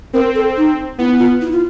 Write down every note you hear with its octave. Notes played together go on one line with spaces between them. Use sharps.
C4 A#4
A4
D#4
B3 E4
F4
E4
F4